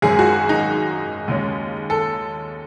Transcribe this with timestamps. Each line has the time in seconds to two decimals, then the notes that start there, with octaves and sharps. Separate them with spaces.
0.02 G#1 F#2 D#3 G#3 G#4
0.19 F#4
0.49 D#4
1.28 D#2 C#3 G#3 C#4
1.90 A4